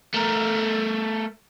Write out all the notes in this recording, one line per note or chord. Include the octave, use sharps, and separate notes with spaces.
A3 A#4